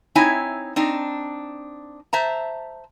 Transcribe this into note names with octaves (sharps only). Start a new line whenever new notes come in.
C4 D#4 E4 C#5 E5 G#5
C4 D4 D#4
C5 E5 A5 A#5